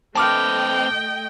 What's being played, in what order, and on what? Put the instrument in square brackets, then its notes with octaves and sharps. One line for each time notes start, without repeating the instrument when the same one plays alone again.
[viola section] A3 D#5 G5 [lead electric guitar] C4 B4 [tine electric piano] A5 D6 F6